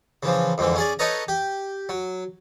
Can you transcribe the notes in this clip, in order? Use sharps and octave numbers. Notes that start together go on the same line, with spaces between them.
C#3 E3 F3
F2 G#2 D3 E3
C#4 G#4 D5
D#4 A4 B4 C#5 D#5 A#5
G4
F#3